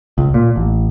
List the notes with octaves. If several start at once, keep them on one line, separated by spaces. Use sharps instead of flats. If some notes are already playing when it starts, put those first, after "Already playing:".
C#2
A#2
A1